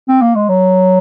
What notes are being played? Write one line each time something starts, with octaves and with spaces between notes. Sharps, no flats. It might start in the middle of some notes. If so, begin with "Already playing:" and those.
C4
A#3
G#3
F#3